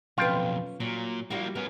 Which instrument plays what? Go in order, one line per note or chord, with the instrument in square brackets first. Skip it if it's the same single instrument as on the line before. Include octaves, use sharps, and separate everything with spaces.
[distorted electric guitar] B1 F2 [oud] C#4 B4 [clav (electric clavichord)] F4 G5
[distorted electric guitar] A#2 [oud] F#3
[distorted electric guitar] F3 A#3 [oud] G3 E4 F#4
[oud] B3 [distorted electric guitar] C#4 A#4